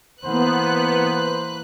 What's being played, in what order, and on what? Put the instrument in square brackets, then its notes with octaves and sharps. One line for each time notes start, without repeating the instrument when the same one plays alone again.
[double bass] E3 A#3 [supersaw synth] B3 [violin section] B4 F#6 [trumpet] C5